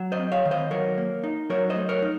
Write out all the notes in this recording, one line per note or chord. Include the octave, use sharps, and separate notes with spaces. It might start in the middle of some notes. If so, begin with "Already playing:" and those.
Already playing: F#3
C5 D#5
C4
C#5 F5
D#3
C5 D#5
F#3 A#4 C#5
A#3
D#4
F#3 A#4 C#5
C5 D#5
A3
A#4 C#5
D#4